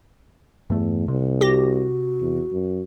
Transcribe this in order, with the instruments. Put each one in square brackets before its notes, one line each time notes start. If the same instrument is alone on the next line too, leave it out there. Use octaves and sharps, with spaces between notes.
[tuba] E2 [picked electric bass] G2 A3
[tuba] C2 [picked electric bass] C3
[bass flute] F#4 [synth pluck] G4 A#6
[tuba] E2
F#2